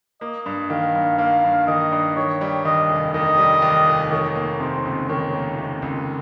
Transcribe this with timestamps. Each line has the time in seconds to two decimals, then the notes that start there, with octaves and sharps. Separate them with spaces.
0.21 A#3 D#5
0.46 G2
0.70 D#3 F5
0.95 G2
1.18 A#3 F5
1.44 G2
1.67 D#3 D#5
1.92 G2
2.16 D#3 C#5
2.41 G3
2.65 D#2 D#5
2.89 F1
3.14 D#3 D#5
3.38 G3
3.62 D#2
3.87 F1
4.11 D#3 C#5
4.36 A#3
4.60 C3 C5
4.85 C#2
5.09 D#3 C#5
5.34 A#3
5.58 C3
5.82 C#2